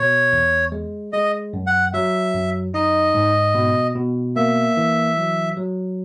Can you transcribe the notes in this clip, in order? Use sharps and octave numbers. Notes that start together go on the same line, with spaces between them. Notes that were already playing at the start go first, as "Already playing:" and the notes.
Already playing: B2 C#5
E2
G#3
G#3 D#5
F#2
F#5
F#3 E5
F#2
D#4 D#5
G#2
B2
B2
A#3 E5
E3
F#3
F#3